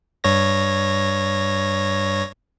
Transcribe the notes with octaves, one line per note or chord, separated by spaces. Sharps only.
G2 C#5 A#6